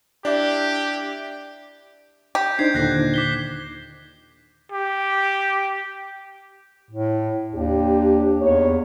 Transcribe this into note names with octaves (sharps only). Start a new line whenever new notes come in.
D4 E4 G4 D5 E5
G4
D4 D#4 C5 G6 G#6 C7
D#2 A#2 D3 F#6 A#6 C7
D6 B6 G7
G4
A2
D#2 D4 G4
E2 A#3 D#4 C#5